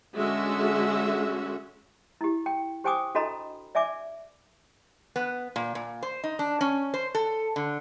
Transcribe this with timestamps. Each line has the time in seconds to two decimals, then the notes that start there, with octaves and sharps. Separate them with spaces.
0.16 D3 G#3 C#4 F#4 E5
2.21 E4 G4
2.46 G5
2.84 G4 C5 G5 G#5 D6 D#6
3.15 D4 F#4 A4 D#5 A#5 B5
3.75 D5 E5 G#5 D6
5.16 B3
5.56 A#2
5.75 A#2
6.03 C5
6.24 D#4
6.39 D4
6.61 C#4
6.94 C5
7.15 A4
7.56 D3